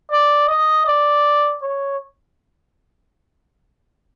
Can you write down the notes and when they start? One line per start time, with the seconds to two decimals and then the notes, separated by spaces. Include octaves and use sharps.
0.10 D5
0.48 D#5
0.86 D5
1.62 C#5